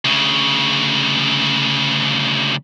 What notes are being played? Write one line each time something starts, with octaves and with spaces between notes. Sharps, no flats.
D2 C#3